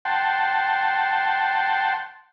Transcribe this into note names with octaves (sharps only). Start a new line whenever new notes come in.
F#5 G5 A5 C6